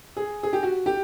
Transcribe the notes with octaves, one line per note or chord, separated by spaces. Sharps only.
G#4
G#4
G4
F#4
G4